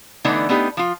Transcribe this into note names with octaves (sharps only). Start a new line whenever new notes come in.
D3 E3 A3 B3 D4 D#4
A3 B3 D4 D#4 G4
F3 F4